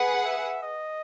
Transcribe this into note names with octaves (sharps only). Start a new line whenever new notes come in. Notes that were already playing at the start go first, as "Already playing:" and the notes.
Already playing: G#4 B4 F#5
E5
D#5